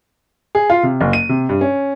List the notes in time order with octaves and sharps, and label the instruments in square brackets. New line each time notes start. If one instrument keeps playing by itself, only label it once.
[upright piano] G#4
F4
C3
F#1
D#7
C3
G2
C#4